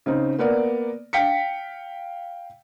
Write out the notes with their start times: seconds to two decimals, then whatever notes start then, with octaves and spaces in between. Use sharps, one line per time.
0.06 C#3 C4 D#4
0.38 A#3 B3 A#4 D5
1.13 F5 G5 B6 C#7